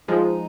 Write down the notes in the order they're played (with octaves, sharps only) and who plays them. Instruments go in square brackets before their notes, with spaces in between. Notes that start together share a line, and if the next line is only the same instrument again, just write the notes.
[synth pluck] F3 G#3 [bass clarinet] D#4